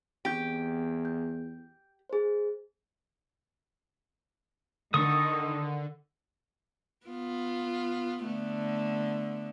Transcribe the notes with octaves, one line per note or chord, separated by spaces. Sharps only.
E2 C4 G4 G6
G6
G#4 C5
D3 D#3 A4 C#6 D#6
B3 F4
D3 A3 B3